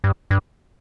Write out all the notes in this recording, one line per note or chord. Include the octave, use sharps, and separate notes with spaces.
G2
G2